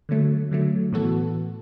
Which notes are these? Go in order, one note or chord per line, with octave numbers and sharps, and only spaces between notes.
D3 F#3 A3
D3 F#3 A3
A2 E3 B3 F#4 A4